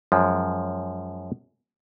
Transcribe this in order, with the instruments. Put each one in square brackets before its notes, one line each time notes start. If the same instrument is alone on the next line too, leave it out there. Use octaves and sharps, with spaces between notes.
[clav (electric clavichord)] F#2 F3 G#3